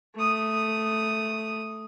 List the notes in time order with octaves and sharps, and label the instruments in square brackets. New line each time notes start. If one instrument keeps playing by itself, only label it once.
[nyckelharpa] A3 D#6